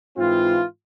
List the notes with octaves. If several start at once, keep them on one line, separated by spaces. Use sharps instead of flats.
G#2 E3 C4 F4